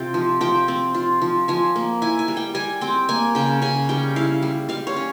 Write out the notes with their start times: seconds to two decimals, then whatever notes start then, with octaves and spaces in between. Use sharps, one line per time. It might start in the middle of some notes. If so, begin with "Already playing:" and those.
Already playing: C3 F4 G5
0.14 F3
0.41 F3 G5
0.68 C4
0.94 F4
1.22 F3
1.48 F3 G#5
1.76 A#3
2.02 E4 G#5
2.19 G#5
2.28 G3
2.37 G5
2.55 G3 G#5
2.81 C4 G5
3.09 A#3 G#5
3.35 C#3 G5
3.62 C#3 G#5
3.89 G3 G5
4.16 E4 F5
4.42 G3
4.69 G3 F5
4.87 C#5
4.96 C#4